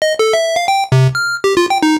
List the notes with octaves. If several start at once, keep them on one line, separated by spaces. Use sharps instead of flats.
D#5
A4
E5
F5
G5
C3
F6
G4
F4
G5
D#4